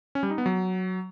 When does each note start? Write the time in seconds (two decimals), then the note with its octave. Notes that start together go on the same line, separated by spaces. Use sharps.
0.15 C#4
0.23 G3
0.30 D#4
0.38 B3
0.46 F#3